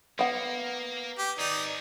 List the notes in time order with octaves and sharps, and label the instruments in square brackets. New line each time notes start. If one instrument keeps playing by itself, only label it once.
[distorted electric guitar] A#3 [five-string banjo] B3 F#5
[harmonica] G4
[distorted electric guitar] D#3 G#4 [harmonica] D#4 D5